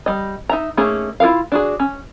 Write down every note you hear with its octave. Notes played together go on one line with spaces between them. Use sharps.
G3 D#5
D#4 E5 A#5
A3 A#3 C#4 D#4 G#4
E4 F4 G#4 A#4 F5
D4 F#4 G#4
C#4